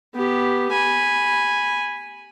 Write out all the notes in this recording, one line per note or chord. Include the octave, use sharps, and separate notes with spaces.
B3 G4
G#5 B5